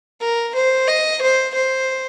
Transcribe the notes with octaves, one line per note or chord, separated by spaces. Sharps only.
A#4
C5
D#5
C5
C5